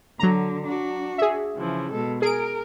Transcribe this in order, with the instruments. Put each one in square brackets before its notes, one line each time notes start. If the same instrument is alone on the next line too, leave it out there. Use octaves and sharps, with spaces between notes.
[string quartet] D3 [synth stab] F#3 A#5
[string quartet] D4 F#4
[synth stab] G#4 E5
[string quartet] C#3 E3 F3
B2 G#3 A4
[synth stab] G#4 D7 [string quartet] A#4